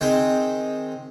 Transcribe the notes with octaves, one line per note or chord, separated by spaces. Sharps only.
D#3 G#3 C4 G5